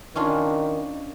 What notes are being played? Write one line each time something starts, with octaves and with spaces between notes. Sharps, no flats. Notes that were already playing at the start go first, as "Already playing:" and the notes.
D#3 C#4 D4 F4